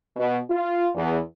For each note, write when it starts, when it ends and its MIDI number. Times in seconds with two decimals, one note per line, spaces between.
0.17 0.37 47
0.50 0.88 65
0.95 1.19 40